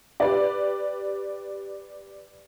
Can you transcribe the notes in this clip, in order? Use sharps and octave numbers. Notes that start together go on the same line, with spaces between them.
G4 B4 D5